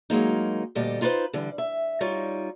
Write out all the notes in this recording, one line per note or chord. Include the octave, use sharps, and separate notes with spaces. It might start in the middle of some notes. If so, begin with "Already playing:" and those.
F#3 G#3 A#3 D#4
D2 A#2 G3 G4 A4 D#5
D#4 F4 G4 B4 C5
D3 E3 G3
E5
G3 D#4 F4 C#5